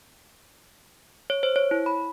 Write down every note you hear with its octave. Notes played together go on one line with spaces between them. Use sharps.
C#5
C5
C#5
E4
B5